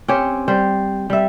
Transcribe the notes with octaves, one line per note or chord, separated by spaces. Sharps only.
C4 C#4 G4 C#5
G3 C5
G3 E5